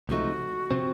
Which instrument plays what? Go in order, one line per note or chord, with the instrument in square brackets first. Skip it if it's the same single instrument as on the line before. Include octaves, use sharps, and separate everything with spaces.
[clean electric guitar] C#2 C3 F3 A3 D#4 [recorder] F#4
[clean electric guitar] C3 F3 C4